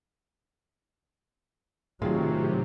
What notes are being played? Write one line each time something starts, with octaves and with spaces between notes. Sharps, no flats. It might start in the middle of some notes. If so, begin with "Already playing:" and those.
A2 C3 D#3 F#3 F4 G#4